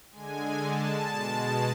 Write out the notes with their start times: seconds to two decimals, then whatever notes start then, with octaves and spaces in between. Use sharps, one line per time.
0.11 D3 G#3 G#5
0.61 A5
1.09 B2 G#3